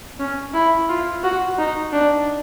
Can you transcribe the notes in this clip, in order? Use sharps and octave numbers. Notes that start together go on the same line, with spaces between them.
C#4
E4
F4
F#4
D#4
D4